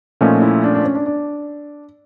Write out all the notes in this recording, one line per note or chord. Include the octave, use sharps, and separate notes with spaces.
A#2 F3 A3 C#4 D#4
E4
D4
D4
C#4
D4
D4